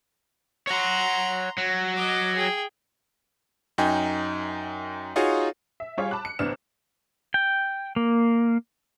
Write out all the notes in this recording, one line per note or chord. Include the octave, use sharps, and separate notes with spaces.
C#5 F#5 A#5 C6
F#3
D#5 D6
G#4 G5
F#2 D#4 G5 G#5
D#4 F4 F#4 G#4 C#5 F5
E5
G3 F4 G#4 C#5 F5
A5 B5 D6 F#6
C#7
A1 C3 B3 D4 F6 E7
G5
A#3